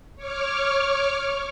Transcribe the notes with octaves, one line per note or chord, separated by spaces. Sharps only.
C#5 C#6 D6 F6